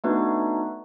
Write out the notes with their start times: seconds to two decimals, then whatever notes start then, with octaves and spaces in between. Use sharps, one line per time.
0.04 A3 B3 D4 D#4 F#4 B4